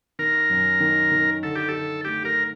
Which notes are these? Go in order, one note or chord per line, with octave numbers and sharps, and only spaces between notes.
D#3 A#4
F#2
D#3
D#3
D3 A4
G4
D3 A4
A3 G4
A#4